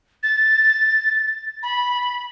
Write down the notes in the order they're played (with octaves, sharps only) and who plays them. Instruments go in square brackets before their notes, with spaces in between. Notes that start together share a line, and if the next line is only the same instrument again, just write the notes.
[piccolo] A6
B5